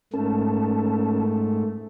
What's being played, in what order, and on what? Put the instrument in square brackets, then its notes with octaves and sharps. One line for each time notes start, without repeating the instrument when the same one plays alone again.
[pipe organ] G#2 A3 [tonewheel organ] C#4 A#4 A5